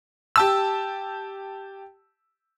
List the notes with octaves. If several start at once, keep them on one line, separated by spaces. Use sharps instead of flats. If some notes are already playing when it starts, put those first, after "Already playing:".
G4 A5 E6